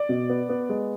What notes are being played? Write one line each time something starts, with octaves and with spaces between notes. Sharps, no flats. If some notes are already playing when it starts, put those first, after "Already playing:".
Already playing: D5
B2
B3
B3
G#3